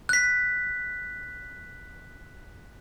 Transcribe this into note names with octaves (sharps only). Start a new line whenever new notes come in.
F#6 B6